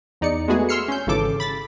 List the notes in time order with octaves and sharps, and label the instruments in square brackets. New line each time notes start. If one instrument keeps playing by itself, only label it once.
[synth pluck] E2 D#4 D5 C#7
G#3 A3 B3 F#4 G#4
C6 E6 F6 C7 C#7
C#4 G6
G#1 C#3 E3 A4 D6
B5 A6 B6